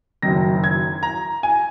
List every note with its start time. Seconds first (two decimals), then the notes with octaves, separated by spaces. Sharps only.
0.22 F#1 F#2 D#3 A#6
0.64 G#6
1.03 A#5
1.43 G#5